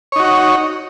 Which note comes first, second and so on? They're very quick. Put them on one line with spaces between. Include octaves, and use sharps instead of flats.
C#5 D#4 F#4